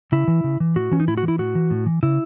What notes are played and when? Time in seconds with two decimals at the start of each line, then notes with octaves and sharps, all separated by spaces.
0.12 C#3 E4
0.28 E3
0.44 C#3
0.60 E3
0.76 A2 F#4
0.91 E3 C#4
1.00 D#4
1.08 A2 E4
1.17 F#4
1.23 E3
1.28 E4
1.38 A2 F#4
1.55 E3
1.70 A2
1.86 E3
2.03 C#3 E4